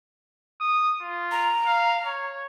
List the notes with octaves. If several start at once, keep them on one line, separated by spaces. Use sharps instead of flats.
D#6
F4
A#5
F5
C#5